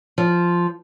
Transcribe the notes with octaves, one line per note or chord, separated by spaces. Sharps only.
F3